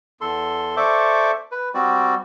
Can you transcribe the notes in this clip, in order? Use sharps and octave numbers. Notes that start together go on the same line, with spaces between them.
E2 A4 C6
A4 C5 D5 E5 C#6 D6
B4
G3 C4 F#4 D5